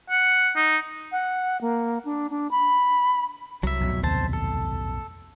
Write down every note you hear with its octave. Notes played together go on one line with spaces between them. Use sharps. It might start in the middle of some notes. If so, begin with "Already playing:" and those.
F#5
D#4
F#5
A#3
D4
D4
B5
C2 F#3 E5
B1 F2 A2
D#2 C3 C5 A5
A4